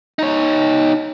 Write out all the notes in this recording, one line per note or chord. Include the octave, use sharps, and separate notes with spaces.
D#4 C#5